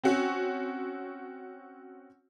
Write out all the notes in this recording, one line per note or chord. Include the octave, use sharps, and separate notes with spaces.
C4 C#4 F#4